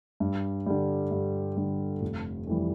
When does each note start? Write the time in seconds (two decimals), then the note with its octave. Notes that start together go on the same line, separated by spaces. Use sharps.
0.20 G2
0.66 D3 G3
1.11 G2
1.57 D3 G3
2.02 F1
2.47 F2 E3 G3